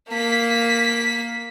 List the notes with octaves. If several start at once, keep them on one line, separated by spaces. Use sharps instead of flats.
A#3 B6